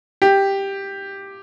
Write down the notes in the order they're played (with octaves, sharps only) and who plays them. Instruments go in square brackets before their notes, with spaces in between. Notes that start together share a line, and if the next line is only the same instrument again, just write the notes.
[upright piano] G4